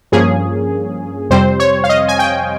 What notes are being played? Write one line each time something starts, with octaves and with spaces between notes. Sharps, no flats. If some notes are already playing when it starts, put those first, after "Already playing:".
G2 F3 A#3 C#4 G#4
F2 C3 G3 C4 C5
C#5
F5
D#5
G#5
G5